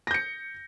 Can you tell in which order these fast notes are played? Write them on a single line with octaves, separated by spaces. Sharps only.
A#6 G6 C#7